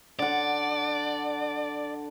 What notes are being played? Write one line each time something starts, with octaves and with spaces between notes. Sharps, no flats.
D3 D5 F#5